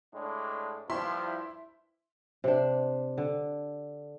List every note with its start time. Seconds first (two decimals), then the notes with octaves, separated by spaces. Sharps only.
0.14 A2 G#3 D4
0.90 G2 F3 E4 E5 C6
2.44 C3 D4
3.18 D3